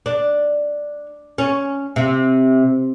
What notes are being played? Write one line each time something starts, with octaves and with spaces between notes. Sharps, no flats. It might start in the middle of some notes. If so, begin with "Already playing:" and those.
D4
C#4
C3